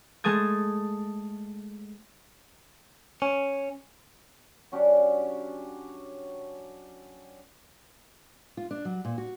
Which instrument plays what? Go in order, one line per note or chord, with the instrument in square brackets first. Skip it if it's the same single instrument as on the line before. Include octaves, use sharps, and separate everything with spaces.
[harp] G#3 A3 A5 D#6 G#6
[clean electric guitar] C#4
[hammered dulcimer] F#3 C#4 D4 G4
[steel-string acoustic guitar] F4
D4
F#3
A#2
F#4